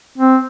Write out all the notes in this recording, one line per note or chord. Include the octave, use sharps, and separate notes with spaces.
C4